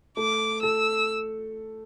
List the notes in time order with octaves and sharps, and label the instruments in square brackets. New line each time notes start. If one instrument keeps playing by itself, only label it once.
[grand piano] A3 [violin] D6
[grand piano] A4 [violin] E6